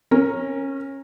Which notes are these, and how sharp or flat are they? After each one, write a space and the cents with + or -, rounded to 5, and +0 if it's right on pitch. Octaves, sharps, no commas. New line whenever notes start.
C#4 -20 A#4 +0